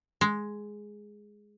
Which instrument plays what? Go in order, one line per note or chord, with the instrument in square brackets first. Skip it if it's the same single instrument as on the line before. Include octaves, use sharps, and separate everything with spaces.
[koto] G#3